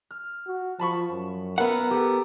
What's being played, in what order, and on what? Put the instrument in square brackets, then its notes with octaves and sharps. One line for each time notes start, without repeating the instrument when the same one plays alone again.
[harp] F6
[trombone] F#4
[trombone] F3 [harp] A5 B5 C#6
[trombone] F#2
[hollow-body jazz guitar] B3 F#5 [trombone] A#4 [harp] E5
[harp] G4 A4